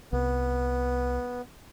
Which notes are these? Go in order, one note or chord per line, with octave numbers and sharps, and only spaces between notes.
C2 B3